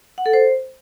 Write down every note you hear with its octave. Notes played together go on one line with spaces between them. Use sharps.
F#5
A4
C5